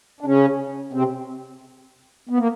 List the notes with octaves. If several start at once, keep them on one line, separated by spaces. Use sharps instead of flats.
D4
C#3 C#4
C3 C4
B3
A#3